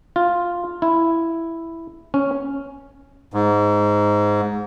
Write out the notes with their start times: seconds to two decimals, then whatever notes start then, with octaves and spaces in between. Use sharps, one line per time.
0.16 F4
0.82 E4
2.14 C#4
3.34 G#2